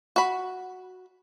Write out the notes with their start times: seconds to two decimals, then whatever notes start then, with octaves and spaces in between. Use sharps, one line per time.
0.16 F#4 B5